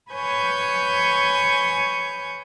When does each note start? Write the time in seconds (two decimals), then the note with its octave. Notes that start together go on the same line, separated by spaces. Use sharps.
0.13 B4 C#5 G#5 C#6 D#6 G6